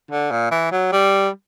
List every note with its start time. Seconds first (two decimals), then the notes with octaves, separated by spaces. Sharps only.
0.11 D3
0.31 A#2
0.51 E3
0.72 F#3
0.92 G3